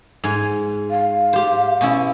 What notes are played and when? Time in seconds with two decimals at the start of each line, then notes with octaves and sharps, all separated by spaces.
0.24 G#2 G#5
0.91 F5
1.33 G4 C5
1.81 B2 C#4 E4